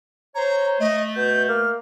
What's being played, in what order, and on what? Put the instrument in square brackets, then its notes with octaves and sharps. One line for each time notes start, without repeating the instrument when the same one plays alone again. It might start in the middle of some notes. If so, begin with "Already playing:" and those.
[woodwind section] C5 C#5 [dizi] A#5
[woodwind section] A3 [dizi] D#5
[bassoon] B2 [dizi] G6
[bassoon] A#3 [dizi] F6